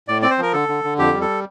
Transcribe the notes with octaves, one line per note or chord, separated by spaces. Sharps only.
A2 D5
C4 D5
C5
F3 A#4
D3 A4
D3
D3
F2 G4
G3
A4